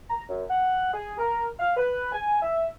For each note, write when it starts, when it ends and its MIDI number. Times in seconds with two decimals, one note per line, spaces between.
0.10 0.23 82
0.29 0.44 42
0.50 0.93 78
0.93 1.14 68
1.18 1.46 70
1.59 1.73 77
1.76 2.09 71
2.12 2.40 80
2.41 2.67 76